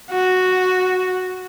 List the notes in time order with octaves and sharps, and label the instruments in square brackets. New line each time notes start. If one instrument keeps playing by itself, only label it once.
[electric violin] F#4